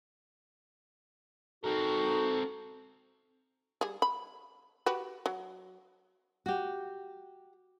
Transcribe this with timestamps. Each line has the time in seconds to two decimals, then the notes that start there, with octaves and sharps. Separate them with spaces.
1.64 C4 D#4 F#4 A4 A#4
3.81 G3 G#4
4.02 B5
4.86 F#4 G4 B4
5.26 F#3
6.46 F#4 G4